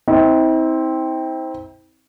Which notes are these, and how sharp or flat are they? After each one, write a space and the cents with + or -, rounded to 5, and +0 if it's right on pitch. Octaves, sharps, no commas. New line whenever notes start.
C4 +0 E4 -45